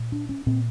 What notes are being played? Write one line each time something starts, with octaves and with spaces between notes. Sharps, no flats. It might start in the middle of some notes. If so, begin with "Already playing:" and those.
Already playing: A#2
D4
C#4
A#2 C4